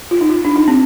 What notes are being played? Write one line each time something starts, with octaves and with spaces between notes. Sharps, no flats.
F4
D#4
F4
D4
D#4
C4